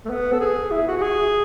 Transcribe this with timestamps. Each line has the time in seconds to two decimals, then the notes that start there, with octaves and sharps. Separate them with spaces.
0.05 A3
0.10 B3
0.33 A4
0.40 G#4
0.71 E4
0.87 F#4
0.98 F#4
1.02 G#4